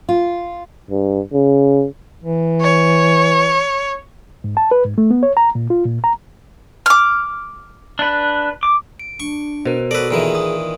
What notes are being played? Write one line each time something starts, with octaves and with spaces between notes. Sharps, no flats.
F4
G2
C#3
E3
C#5
G#2
A5
B4
G#2
A3
B3
C#5
A#5
A#2
F4
A#2
A#5
D6 F6
D4 B4
D6
D7
D4 C#6
B2 A#4 C5
F#4 A4 B4 D5 E6
A#2 D#3 E3 G#4
D#6